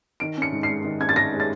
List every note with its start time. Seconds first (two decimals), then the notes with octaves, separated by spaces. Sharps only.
0.20 D#3 D7
0.37 C#4 C#7
0.53 G#2
0.63 C7
0.69 G#3
0.84 D#3
1.00 C#4 G#6
1.09 A6
1.16 G#2 A#6
1.33 G#3
1.40 A6